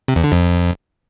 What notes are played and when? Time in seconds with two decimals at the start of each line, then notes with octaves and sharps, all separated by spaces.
0.08 C3
0.16 E2
0.24 D3
0.32 F2